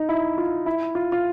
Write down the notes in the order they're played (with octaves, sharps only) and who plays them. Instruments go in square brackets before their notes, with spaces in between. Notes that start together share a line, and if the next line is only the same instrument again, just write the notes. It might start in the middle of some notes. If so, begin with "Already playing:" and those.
Already playing: [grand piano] D#4
E4
F4
E4
F4
F4